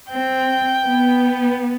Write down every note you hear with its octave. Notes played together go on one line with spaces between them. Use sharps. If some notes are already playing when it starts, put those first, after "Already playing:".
C4 G5
B3